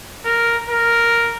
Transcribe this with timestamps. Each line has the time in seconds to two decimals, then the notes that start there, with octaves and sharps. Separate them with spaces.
0.25 A#4
0.70 A#4